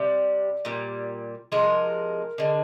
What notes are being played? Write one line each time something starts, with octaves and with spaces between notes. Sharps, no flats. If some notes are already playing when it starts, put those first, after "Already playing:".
Already playing: C3 G3 D5
A#2 G3
C3 F3 G#3 A#4
D3 G#3